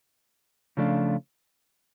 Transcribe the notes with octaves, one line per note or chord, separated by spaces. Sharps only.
C#3 F3 A3 D4 F4